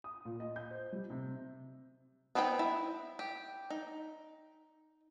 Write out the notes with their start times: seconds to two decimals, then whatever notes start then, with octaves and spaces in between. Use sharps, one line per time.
0.04 D#6
0.25 A#2
0.40 D#5
0.56 G6
0.71 C5
0.92 G3
1.10 C3
2.35 B3 C4 D#4 B4 G5
2.59 E4
3.19 G4
3.70 D#4